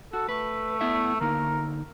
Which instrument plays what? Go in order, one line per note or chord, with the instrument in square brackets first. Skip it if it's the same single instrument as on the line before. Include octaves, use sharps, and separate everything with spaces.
[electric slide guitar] F#4 [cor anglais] A4
[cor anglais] A3 [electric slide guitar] B4
[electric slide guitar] B3 E4 E5
[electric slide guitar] D3 A#3 D#4 [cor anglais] A#4